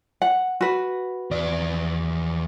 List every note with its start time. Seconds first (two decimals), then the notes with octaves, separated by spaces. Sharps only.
0.22 F#5
0.61 F#4 B4
1.31 E2 D5